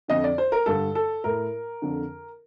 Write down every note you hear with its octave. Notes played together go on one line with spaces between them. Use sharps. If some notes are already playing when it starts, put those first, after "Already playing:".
F2 D3 D#5
D5
C5
A#4
G2 D3 A4
A4
A2 A#4
F2 D3